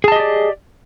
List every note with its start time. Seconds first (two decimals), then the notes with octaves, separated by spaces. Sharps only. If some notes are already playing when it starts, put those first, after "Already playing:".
0.04 G#4
0.08 A5
0.12 D#5
0.16 G4
0.20 D5